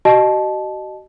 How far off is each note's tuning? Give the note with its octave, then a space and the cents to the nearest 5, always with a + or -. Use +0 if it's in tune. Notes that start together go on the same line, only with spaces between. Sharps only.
F#4 +40 D#5 -20 A5 -20